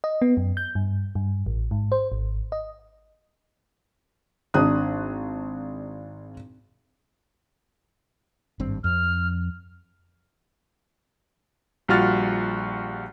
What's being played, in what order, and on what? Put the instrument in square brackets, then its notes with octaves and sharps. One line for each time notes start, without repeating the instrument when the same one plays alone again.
[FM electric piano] D#5
B3
F#2
G6
G2
G2
A1
G#2
C5
G#1
D#5
[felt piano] G#1 D4 A#5 D#6 F#6
[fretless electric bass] G#1 G2 C4
[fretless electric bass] F2 [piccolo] F6
[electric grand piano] A#1 G3 F4 F#4 F6 A6